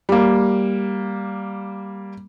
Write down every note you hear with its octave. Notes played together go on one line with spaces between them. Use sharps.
G3 A#3